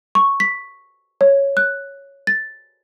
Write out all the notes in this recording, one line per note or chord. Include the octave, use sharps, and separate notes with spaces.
C#6
B6
C#5
F#6
A6